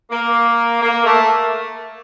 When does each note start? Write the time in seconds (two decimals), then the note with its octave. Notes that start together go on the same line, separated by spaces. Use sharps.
0.11 A#3
0.81 A#3
1.05 A3